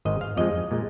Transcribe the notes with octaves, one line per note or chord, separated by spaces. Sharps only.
G#1 G#2 D#3 D#5
F5
F2 F3 G#3 D#5
A#2 G#3